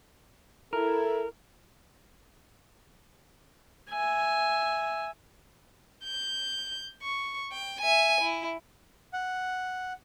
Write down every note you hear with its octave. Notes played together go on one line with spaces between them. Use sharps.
E4 A4 A#4
E5 G#5
G6
C#6
G5
E5 G#5
E4
F#5